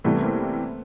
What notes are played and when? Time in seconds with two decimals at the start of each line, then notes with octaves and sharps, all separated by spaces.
0.04 C3 E3 G3 A3 B3
0.22 A#3 C4